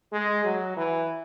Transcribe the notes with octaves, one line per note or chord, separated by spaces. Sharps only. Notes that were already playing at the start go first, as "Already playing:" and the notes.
G#3
F#3
E3